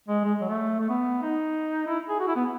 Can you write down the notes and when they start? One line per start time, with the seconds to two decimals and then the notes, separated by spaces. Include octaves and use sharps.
0.08 G#3
0.24 G#3
0.41 F#3
0.49 A3
0.80 A3
0.89 B3
1.22 D#4
1.87 E4
2.09 G#4
2.20 F#4
2.28 E4
2.36 B3